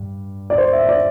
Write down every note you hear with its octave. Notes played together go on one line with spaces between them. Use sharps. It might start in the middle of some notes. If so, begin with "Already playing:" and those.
Already playing: G2
D5
C5
E5
D5